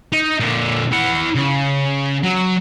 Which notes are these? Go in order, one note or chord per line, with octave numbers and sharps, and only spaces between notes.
D#4
A#2 D3
E4 F#5
C#3
F#3